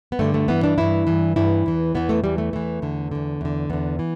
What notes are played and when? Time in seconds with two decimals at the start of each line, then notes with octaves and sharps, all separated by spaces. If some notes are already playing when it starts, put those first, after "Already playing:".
0.12 B3
0.19 G2 D3 A3
0.34 A3
0.48 G2 E3 B3
0.63 D4
0.78 G2 E3 E4
1.07 G2 E3
1.36 G2 E3 E4
1.66 E2 E3
1.95 E2 E3 B3
2.09 A3
2.23 E2 E3 G3
2.38 A3
2.53 E2 E3 A3
2.82 E2 D3
3.12 E2 D3
3.41 E2 D3
3.70 E2 D3 B3
3.99 E3